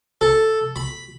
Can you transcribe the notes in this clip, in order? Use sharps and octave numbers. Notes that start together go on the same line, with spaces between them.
A4
B5